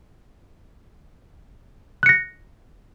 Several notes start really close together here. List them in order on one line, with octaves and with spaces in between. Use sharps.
F#6 C#7 A#6